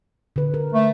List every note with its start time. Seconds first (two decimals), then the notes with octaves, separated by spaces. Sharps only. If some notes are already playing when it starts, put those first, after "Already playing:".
0.36 D3 B4
0.54 A#4
0.73 A3